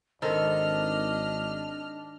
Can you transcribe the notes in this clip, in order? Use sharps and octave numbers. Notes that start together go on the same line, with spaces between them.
G#1 D#3 C4 D4 A4 D#5 F6